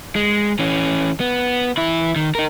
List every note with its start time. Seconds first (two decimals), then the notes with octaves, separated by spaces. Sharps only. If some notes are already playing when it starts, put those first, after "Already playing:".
0.16 G#3
0.59 E3 C#4
1.20 B3
1.77 E3 E4
2.16 D#3
2.35 D#4 A#4